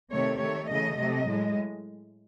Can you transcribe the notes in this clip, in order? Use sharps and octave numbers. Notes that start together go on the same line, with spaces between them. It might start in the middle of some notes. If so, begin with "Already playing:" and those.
C3 D#3 A3 C#5
D#3 A3 C#5
C#3 E3 A3 D#5
C3 F#3 A3 D#5
A2 G#3